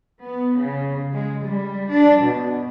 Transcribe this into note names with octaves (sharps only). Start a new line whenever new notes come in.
B3
C#3
G#3
G3
D4
B2